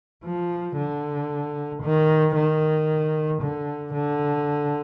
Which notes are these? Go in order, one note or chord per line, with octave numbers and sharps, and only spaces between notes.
F3
D3
D#3
D#3
D3
D3